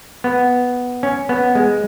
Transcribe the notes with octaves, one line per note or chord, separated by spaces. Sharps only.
B3
C#4
B3
G#3